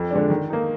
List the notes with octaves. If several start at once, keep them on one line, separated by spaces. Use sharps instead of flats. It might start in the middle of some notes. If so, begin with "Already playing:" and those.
Already playing: F2
D3 G#3 D4
D#3
A#3 D#4